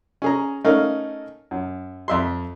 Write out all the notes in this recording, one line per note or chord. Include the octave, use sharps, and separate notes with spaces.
C#4 G#4 A#5
A3 C#4 D#4 A#4 F5
F#2
F2 E5 C6